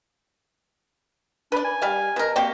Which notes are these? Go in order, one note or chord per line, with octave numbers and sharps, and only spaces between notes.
D4 B4 D5
G#5
G3 F5
B2 A#4
A#3 C4 F#4 G4